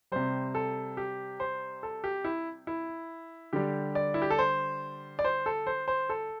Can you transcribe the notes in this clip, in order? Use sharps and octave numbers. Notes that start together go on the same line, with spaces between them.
C3 G3 C5
A4
G4
C5
A4
G4
E4
E4
D3 G3 G4
D5
E4
G4
A4
C5
D5
C5
A4
C5
C5
A4